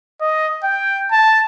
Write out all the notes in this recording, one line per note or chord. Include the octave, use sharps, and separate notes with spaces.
D#5
G5
A5